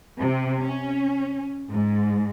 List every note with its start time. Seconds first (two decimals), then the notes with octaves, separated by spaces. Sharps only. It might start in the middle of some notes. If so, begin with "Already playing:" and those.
0.21 C3
0.63 C#4
1.70 G#2